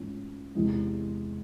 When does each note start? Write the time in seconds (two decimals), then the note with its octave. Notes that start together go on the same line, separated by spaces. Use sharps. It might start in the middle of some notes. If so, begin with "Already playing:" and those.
Already playing: G#2 E3 A3 C#4 F4
0.55 E2 C3 E3 G#3